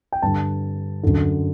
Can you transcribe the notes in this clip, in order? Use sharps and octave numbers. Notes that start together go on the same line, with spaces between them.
G5
G2 D3 A5
F#2 D3